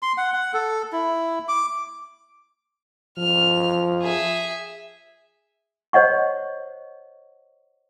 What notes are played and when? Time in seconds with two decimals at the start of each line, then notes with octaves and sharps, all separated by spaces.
0.02 C6
0.18 F#5
0.34 F#5
0.54 A4
0.93 E4
1.48 D6
3.18 F3 F6
4.02 G#4 E5
5.93 C5 C#5 D#5 F#5 C#6